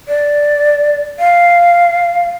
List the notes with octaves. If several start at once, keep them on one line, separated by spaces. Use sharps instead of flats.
D5
F5